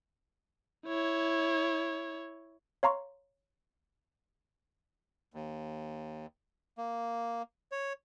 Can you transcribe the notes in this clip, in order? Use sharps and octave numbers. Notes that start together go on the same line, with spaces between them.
E4 C#5
C#5 F5 A#5 C6 C#6
D#2
A#3
C#5